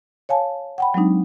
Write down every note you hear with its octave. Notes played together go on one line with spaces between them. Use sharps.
C#5 F5 G#5 A5
F#5 G5 B5
F#3 G#3 C4 D4 D#4